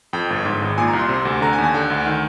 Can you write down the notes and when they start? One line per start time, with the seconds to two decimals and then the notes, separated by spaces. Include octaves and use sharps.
0.13 F2 G5
0.30 G1
0.45 G#2
0.62 G#1
0.78 A#2 G#5
0.88 A#5
0.93 C2
0.99 C6
1.09 C3
1.25 D2
1.41 D3 A#5
1.53 G#5
1.58 D#2
1.64 G#5
1.74 D3 G5
1.90 D2
2.06 D#3